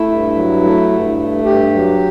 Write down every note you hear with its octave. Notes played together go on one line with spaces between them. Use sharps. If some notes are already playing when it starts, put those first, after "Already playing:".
Already playing: A3 E4
G2
F#3
A3
G2
A3
G2 G4
F#3